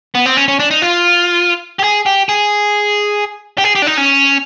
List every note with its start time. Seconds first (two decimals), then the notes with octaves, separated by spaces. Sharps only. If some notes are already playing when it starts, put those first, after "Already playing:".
0.15 B3
0.26 C4
0.37 C#4
0.48 C#4
0.60 D4
0.71 D#4
0.82 F4
1.79 G4
1.84 G#4
2.06 G4
2.29 G#4
3.58 G4
3.64 G#4
3.75 G4
3.82 D4
3.87 D#4
3.97 C#4